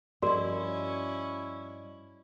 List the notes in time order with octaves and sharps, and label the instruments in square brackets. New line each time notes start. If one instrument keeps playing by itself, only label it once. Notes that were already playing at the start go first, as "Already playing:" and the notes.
[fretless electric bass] G2 F3 [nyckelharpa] C#4 E4 [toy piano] F#4 A#4 [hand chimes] D5 D#5